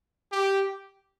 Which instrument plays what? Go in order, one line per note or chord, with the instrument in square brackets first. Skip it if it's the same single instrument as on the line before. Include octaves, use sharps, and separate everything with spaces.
[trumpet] G4